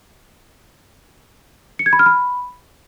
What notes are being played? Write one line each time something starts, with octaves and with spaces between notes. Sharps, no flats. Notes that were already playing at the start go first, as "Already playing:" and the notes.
C#7
G#6
B5
F6
B5